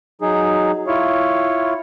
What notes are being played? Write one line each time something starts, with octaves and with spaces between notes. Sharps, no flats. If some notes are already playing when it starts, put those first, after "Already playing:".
F#3 D#4 G#4
E4 F4 C#5